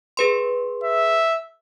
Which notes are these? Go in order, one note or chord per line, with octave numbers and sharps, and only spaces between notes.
G#4 B4 C6
E5